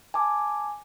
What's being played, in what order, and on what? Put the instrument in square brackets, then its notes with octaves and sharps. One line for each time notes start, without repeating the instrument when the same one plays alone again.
[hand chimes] G#5 A5 D6